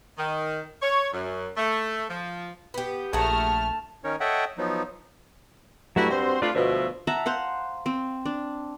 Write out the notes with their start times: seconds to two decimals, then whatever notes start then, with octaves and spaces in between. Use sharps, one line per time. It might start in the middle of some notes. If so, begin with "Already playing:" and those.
0.18 D#3
0.82 C#5
1.12 F#2
1.57 A3
2.09 F3
2.74 B3 G4
3.13 A#1 A3 G#4 F#5 A5 A#5 F6
4.04 D#3 C#4 D#4 A#4 C#5
4.20 A4 C#5 D#5 E5 F#5 G5
4.58 F3 F#3 B3 D#4
5.96 G2 F#3 A3 E4 F#4
6.11 C4 F#4 C5
6.42 A3 D4 F4 B4 D5
6.55 D2 G2 B2 F3 E5
7.07 E5 F#5 A5 A#5
7.26 C5 F5 F#5
7.86 C4
8.25 D4